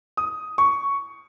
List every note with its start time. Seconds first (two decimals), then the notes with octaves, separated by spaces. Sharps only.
0.17 D#6
0.58 C#6